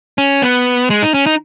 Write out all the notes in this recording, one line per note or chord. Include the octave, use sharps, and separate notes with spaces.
C#4
B3
G#3
D#4
C#4
D#4